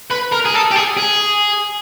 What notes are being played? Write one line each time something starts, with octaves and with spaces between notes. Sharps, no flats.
B4
A#4
G#4
A4
G4
G#4
G#4